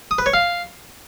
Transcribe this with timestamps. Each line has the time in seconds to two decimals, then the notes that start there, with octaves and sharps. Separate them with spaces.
0.11 D#6
0.18 B4
0.26 C#5
0.34 F5